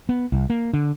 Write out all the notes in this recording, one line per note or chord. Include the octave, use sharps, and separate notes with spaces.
B3
C2
A#3
D3